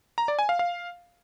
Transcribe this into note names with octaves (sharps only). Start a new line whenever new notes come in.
A#5
D5
G#5
F5
F5